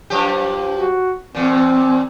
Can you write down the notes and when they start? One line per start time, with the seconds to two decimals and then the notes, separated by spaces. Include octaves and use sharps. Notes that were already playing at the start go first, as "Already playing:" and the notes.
0.10 F#2 F3 G4
0.77 F#4
1.35 E2 A#2 C4